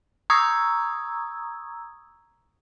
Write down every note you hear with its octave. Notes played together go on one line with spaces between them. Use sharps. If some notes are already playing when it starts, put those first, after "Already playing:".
A#5 C#6 D#6 E6 G#6